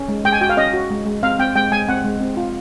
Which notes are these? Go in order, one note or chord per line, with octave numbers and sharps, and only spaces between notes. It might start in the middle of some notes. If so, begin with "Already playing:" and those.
Already playing: C#4
G#3
G#3 G5
G#5
F#4 G5
F5
C#4 D#5
F#4
G#3
G#3
C4 F5
C4 G5
G#3 G5
G#3 G#5
C4 F#5
G#3
C4
F4